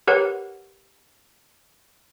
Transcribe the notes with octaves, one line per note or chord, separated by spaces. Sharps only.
G4 A#4 B4 C#5 F#5